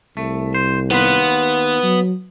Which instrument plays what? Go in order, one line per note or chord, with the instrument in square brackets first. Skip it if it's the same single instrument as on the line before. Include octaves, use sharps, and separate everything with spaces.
[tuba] C2 [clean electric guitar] A3
[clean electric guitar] C5
[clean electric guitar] D#2 F4 B4 [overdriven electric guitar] B3
[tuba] F#3